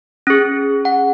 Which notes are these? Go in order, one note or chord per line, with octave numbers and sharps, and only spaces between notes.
C#4 G#4
F#5